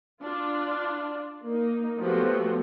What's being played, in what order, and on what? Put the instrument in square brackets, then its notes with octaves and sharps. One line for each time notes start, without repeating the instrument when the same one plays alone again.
[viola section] D4 F4
A#3 D#4
F3 F#3 A3 B3 F#4 G4